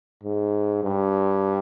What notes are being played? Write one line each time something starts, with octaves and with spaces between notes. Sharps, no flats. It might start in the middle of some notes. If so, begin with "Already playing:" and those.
G#2
G2